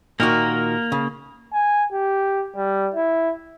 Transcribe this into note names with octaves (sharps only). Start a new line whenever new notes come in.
A#2 D#3 A#3 F#4 A#4
C#3
G#5
G4
G3
E4